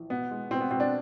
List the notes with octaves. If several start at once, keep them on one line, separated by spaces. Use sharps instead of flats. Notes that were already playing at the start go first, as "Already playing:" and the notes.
Already playing: A#1 E3
B2 B3
G#3
B2 C4
B3
B2 C4
D4